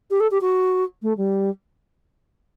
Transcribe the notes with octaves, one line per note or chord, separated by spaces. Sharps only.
G4
A4
G4
F#4
A3
G3